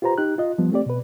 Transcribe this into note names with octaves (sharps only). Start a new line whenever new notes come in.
F4 G4 B4 C5 A#5
D#4 G4 F#6
F4 D#5
F3 G3 B3
A3 C4 G4 D5
B2 B4